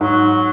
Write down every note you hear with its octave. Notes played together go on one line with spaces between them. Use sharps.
G#2 F#3